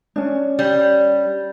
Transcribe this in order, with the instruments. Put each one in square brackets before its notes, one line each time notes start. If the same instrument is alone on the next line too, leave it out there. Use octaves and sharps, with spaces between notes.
[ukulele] C#4 D4
[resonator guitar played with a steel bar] G3